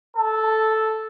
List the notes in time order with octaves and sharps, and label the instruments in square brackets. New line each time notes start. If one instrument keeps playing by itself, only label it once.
[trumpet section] A4